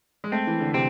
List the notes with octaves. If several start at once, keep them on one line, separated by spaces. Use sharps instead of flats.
G#3
A3 C4
E3
D3
C3 C4